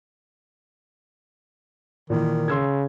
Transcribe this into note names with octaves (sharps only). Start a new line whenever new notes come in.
A#2 D#3 E3
C#3 C6 E6 G#6